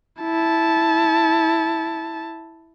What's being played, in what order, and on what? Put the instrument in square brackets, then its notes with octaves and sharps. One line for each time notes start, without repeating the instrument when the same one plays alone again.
[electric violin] E4 A5